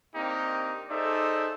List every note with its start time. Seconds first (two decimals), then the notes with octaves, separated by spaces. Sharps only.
0.15 A#3 C4 D4 D#4 G4 A#4
0.89 D#4 G#4 A4 C5 D5 E5